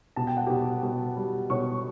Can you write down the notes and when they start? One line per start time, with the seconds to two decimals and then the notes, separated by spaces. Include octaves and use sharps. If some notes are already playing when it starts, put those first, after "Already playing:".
0.16 B2 A5
0.27 G5
0.37 F#5
0.47 B2 G4 G5
0.83 B2
1.16 G3
1.50 B2 C#5 C#6